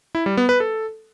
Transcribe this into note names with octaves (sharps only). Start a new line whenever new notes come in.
E4
G3
B3
B4
A4